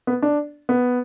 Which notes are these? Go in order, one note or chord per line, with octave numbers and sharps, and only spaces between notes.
B3
D4
B3